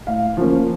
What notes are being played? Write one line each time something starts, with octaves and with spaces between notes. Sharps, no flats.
A2 F5
F3 A#3 C#4